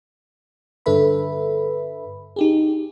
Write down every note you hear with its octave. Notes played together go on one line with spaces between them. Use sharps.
G2 D3 A4 B4 E5 B5
D#4 G4 G#4